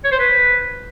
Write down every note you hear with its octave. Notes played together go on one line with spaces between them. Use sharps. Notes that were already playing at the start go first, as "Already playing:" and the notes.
C#5
C5
B4